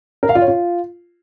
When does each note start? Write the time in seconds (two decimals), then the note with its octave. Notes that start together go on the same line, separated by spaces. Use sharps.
0.23 A#4
0.29 F5
0.35 F4
0.42 C#5
0.48 F4